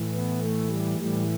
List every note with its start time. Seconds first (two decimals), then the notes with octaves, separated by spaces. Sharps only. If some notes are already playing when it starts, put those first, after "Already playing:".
Already playing: A2 E3
0.13 B3
0.42 A3
0.70 G3
0.99 A2 E3 G3